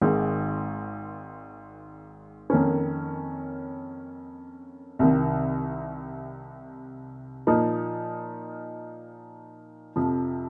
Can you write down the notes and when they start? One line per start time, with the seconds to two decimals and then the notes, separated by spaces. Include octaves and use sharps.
0.02 G#1 G#2 D#3
2.50 F2 D#3 A#3 C#4
4.99 C2 C3 D#3
7.47 A#2 F3 A#3 D#4
9.96 F2 C3 F3